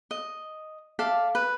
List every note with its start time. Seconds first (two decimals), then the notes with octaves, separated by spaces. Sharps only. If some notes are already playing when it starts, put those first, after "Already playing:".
0.11 D#5
0.99 A4 D5 E5 F5
1.35 B4